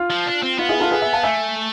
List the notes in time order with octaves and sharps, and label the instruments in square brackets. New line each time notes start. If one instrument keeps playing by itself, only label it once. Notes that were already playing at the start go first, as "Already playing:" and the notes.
Already playing: [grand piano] F4
[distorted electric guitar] F3
D4
C4
[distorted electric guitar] B3 [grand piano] F4
[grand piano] E4 G#4
F4 A4
G#4 B4
E5 G#5
F5 A5
[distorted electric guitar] A3 [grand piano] E5 G#5